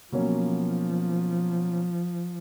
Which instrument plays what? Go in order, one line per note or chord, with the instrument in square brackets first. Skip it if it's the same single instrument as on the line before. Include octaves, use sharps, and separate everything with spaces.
[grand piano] B2 F#3 A#3 C#4 [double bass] F3